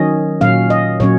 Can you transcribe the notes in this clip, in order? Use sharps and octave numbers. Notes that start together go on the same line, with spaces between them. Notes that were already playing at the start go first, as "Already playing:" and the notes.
Already playing: D#3 F#3 C#4 D#5
A#2 F#3 C#4 F5
D#5
A#2 F#3 C#4 C#5